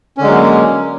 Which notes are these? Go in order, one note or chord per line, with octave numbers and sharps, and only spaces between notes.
D3 F#3 G#3 A#3 C#4